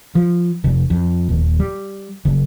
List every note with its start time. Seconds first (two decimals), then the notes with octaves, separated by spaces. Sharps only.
0.15 F3
0.64 F1
0.90 F2
1.29 D#1
1.60 G3
2.25 F#1